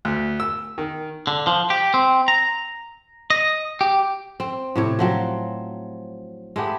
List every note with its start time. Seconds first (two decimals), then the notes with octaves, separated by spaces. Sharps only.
0.05 D2
0.40 E6
0.78 D#3
1.27 D3
1.47 F3
1.70 G4
1.94 C4
2.28 A#5
3.30 D#5
3.81 G4
4.40 C4
4.76 A2 C3 C#5
4.99 F3 F#3 C4
6.56 G#3 A3 B3 G4